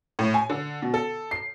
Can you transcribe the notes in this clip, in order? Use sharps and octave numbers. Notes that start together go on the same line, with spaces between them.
A2
G#5
D3
B2
A4
C7